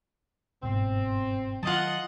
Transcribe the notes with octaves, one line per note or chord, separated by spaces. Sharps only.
G1 G#2 B2 C4
D#3 F#3 F4 D#5 F#5 A5